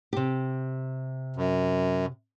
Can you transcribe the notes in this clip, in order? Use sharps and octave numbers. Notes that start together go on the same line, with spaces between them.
C3 G4
F#2